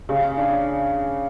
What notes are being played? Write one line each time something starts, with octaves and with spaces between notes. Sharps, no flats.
C#3
D4